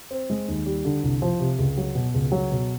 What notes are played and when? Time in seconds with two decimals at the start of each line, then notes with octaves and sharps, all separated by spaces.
0.11 C4
0.30 G#3
0.48 D#2
0.66 G3
0.85 D3
1.03 C2
1.22 F3
1.39 C3
1.59 C#2
1.77 F#3
1.95 B2
2.14 C#2
2.32 F#3
2.51 B2